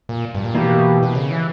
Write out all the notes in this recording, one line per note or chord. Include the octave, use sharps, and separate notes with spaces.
A#2
G2
A#2
B2 E3 A#3 E4 G4
B2
C#3
E3